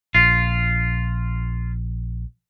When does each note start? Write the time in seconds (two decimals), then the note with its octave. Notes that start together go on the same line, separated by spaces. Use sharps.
0.15 A#1 F4